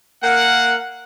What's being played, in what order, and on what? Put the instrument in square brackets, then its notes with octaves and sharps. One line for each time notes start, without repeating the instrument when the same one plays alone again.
[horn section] A#3 A#4 F#5